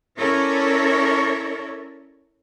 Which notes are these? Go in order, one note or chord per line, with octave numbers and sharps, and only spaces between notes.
C#4 E4 A4 A#4 C#5 D5